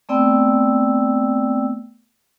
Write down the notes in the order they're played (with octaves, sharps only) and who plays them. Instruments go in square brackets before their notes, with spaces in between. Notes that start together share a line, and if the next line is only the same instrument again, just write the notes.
[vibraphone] A3 B3 C4 D5 G5 E6